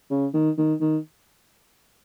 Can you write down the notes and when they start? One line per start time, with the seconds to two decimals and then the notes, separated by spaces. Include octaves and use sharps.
0.10 C#3
0.34 D#3
0.58 D#3
0.81 D#3